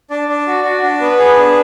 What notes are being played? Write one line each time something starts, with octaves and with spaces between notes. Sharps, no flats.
D4 D5
D4
F#4
F#4
D4
B3 B4
G#4
D4